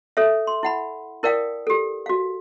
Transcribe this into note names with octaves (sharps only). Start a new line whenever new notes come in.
A4 C#5 E5
C6
E4 F#5 B5
E4 A#4 D5 F5 G5 D#6
G4 A4
F#4 F5